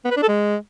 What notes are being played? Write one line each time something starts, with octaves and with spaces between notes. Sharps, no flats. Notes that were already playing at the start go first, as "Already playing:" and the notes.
B3
B4
D4
A4
G#3